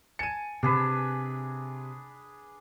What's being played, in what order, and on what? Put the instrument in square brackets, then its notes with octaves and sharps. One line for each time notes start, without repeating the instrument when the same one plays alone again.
[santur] G#5 A5 [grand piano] C#7 D#7
[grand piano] C3 [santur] D4 G#4 B4